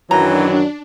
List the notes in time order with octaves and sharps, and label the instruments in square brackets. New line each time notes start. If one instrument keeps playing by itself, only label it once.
[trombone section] F#2 D#3 F#3 [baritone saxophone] E3 [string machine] D4 [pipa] A#5